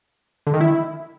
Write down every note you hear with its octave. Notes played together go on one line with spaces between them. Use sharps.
D3
D#3
E4